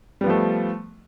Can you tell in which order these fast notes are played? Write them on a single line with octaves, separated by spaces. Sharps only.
G3 B3 F3 A3